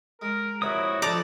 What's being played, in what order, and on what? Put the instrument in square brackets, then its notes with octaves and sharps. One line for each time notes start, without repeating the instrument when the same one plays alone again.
[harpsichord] G#3 [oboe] A#4
[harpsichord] A#1 C3 B5 [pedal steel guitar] E4 C#5 D#6 [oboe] F#4
[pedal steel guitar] F3 D#4 [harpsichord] C4 [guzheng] D5 A#5 [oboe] A5